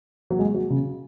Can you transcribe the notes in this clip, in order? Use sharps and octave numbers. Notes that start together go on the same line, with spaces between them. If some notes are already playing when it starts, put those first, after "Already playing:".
F#3
G#3
F#3
C#3